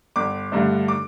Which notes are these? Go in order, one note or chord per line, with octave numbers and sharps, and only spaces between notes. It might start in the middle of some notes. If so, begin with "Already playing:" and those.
G1 D6
G2 D3 A3
D6